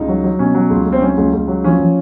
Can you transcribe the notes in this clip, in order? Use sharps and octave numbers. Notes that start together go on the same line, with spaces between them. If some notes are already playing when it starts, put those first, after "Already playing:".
Already playing: C#2 D#4
F#3
F#3
B2 C#4
F#3
C#2
C#2
C4
F#3 C#4
C#2
C#2
F#3
F3 C#4
F3